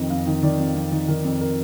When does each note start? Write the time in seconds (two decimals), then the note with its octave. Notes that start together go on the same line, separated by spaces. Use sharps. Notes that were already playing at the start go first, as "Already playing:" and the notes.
Already playing: F2 D#3 D#5
0.10 F2 F5
0.27 D#3
0.43 D#3 D5
0.59 F2
0.75 F2
0.92 D#3
1.08 D#3 A#4
1.24 F2
1.41 A#4